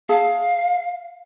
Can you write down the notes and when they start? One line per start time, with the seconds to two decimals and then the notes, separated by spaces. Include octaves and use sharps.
0.09 G#4 E5 F5 A5